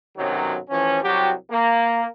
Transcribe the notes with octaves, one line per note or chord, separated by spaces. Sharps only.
B1 F#2 C3 D#3 F#3
A1 E3 F3 C#4
C2 F#3 F#4 G4
A#3